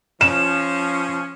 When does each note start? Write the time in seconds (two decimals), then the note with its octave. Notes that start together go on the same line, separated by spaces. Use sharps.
0.21 F3 C#4 E7